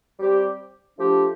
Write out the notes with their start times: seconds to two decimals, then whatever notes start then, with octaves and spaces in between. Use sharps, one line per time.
0.18 G3 C4 G4
0.97 F3 A3 D4 G4